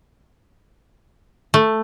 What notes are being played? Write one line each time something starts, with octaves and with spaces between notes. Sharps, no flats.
A3